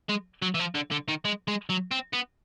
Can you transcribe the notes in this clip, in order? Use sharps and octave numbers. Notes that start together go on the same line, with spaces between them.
G#3
F#3
E3
F3
D3
D3
D#3
G#3
G#3
F#3
C4
B3